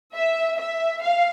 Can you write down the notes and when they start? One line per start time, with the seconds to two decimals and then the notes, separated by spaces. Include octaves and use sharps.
0.14 E5
0.59 E5
1.02 F5